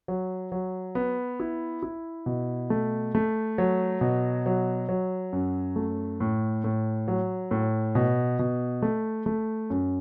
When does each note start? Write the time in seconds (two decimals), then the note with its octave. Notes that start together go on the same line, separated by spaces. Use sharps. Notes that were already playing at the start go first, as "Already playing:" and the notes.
0.08 F#3
0.52 F#3
0.95 B3
1.40 E4
1.83 E4
2.26 B2
2.70 A3
3.15 A3
3.58 F#3
4.01 B2
4.46 F#3
4.89 F#3
5.33 F#2
5.76 A3
6.20 A2
6.64 A2
7.08 F#3
7.51 A2
7.95 B2
8.39 B2
8.82 A3
9.26 A3
9.70 F#2